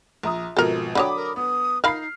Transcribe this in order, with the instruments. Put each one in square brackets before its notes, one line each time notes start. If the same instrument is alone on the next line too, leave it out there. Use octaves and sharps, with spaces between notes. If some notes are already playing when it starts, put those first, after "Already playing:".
[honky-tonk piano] A#1 A#5 D#6
[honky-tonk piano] G#1 B2 F3 [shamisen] A4 A#4
[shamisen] D3 F#3 C#5 [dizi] G5 [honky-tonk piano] B5 D6 D#6
[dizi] A#4
[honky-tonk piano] B3 [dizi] D#6
[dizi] D#4 [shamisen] A#4 F5 B5 [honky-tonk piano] F6 C7